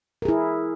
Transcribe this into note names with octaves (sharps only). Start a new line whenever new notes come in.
E4 G#4 A#4